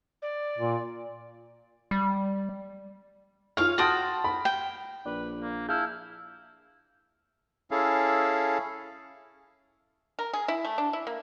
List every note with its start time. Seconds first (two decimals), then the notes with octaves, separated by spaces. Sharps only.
0.22 D5
0.58 A#2
1.91 G3
3.57 F4 C#5 F5 F6
3.78 F#4 G5 A5 C6 D#6 A6
4.24 B5
4.45 G5
5.06 A#1 B4 D5
5.42 A#3
5.69 E4 G#4 F5 A5 E6 F6 G6
7.71 C#4 E4 G#4 A4 F5
10.19 A#4
10.33 G#4
10.48 E4
10.65 A3
10.78 D4
10.93 E4
11.07 A#3